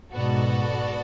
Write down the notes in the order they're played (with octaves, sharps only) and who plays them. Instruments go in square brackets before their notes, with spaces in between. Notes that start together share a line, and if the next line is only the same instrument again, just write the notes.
[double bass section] G#2 B2 [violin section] B3 F#4 A4 D5